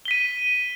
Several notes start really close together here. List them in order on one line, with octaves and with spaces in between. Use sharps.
G7 B6 D#7